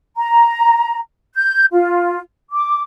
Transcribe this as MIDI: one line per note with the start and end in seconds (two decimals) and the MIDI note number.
0.17 0.99 82
1.35 1.64 91
1.72 2.19 65
2.51 2.82 86